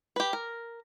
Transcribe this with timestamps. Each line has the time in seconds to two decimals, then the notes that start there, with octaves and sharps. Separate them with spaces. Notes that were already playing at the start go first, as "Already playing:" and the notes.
0.16 G4 B4
0.33 A#4